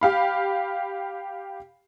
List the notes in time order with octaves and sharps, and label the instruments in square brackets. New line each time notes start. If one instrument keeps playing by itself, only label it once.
[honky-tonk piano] G4 F5 B5